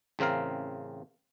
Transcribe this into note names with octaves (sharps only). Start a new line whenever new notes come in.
A1 C#3 C4 A#4 F5